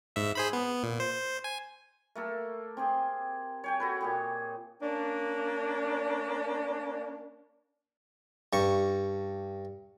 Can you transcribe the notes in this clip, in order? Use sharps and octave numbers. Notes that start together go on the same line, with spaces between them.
G#2 E5
G#4 C5 B5
B3
A#2
C5
G#5
A3 A#3 A4
C4 G4 G#4
C#5 G5 G#5
F#4 A4 B4
A#2 G4 G#4
A#3 C#4 D4
G2 C#6